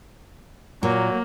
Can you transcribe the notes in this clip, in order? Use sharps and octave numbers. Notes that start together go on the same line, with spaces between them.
A#2 F#3 A#3